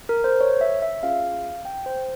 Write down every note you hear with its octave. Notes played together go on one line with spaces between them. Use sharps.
A#4
C5
C#5
E5
E5
C#4 F4 G#4 F5
G5
C5